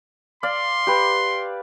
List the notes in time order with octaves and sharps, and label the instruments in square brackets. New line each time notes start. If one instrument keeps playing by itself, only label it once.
[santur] D5 F5 [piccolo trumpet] C6
[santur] G4 B4